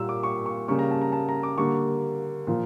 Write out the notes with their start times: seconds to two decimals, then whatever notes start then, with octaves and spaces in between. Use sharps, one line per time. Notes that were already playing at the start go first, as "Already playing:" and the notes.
Already playing: A#2 G3 A#3 E6
0.09 D6
0.23 C#6
0.46 C#6
0.68 C#3 G3 A#3 C#6
0.79 A#5
0.91 A5
1.02 A#5
1.12 A5
1.29 A#5
1.43 D6
1.58 D3 G3 A#3 C#6
2.47 A#2 F3 A#3